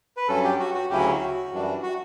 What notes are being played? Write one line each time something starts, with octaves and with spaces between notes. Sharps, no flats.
B4
G2 F#3 C#4 A4
G4
F#4
F#4
D2 C#3 F#3 C#4 E4 G4
F#4
F#4
F#2 E3 G3 D4
F#4